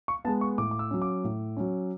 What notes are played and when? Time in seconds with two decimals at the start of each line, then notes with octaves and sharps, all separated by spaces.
0.08 C#6
0.25 B3 A5
0.27 G#3
0.41 C#6
0.58 A2 D6
0.71 D6
0.79 E6
0.91 F#3 C#4
1.02 D6
1.24 A2
1.57 F#3 C#4